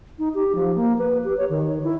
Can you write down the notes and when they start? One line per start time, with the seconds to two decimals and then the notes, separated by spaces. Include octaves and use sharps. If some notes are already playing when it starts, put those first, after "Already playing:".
0.19 D#4
0.34 G4
0.55 F3
0.75 A#3
0.98 B4
1.25 G4
1.37 C#5
1.50 D#3
1.84 E4